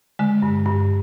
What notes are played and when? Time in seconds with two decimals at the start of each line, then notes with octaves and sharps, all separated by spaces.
0.19 D3 G#3
0.42 G2
0.66 G2